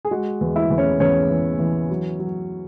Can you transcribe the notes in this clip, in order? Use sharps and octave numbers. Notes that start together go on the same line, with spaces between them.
G#4
G#3 F#4
E2
E4 E5
E2
C#4 C#5
E2 C#4 C#5
E3
E3
F#3
F#3